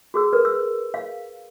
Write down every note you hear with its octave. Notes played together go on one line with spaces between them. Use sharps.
F#4 G#4 E6
A#4 B4
E6
F5